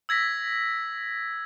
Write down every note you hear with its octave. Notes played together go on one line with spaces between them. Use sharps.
E6 G#6 A#6 B6